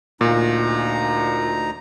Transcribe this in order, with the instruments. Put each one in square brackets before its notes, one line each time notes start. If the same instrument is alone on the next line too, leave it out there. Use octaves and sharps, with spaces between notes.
[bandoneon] D2 D#4 A#5 [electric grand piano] A#2